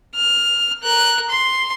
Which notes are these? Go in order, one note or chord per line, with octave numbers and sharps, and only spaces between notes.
F6
A#4 F#6
C6